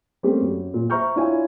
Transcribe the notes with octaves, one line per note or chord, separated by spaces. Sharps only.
G3 A3 A#3 C4 C#4 G4
F#2
A#2
C5 E5 A#5 C#6 F6 G6
D4 E4 F4 C#5 E5 G#5